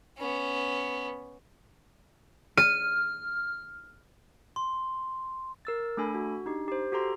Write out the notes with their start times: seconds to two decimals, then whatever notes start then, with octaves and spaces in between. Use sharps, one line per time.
0.18 B3 C#4
2.57 F6 D#7
4.56 C6
5.65 A#4 E6 A6
5.97 A3 D4 A4 G#5 B5
6.15 F#4
6.45 D4 D#4 G4
6.68 G4 C5
6.92 F#4 G4 A4 A#5 C6